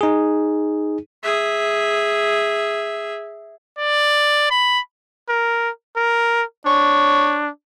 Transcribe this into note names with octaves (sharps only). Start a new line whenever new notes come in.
D#4 G#4
G#4 E5
D5
B5
A#4
A#4
D4 C#5